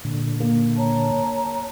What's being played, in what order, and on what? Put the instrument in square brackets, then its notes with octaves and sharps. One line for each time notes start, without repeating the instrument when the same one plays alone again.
[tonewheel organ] A#2 D3
[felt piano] A#3
[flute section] C#5 A5 A#5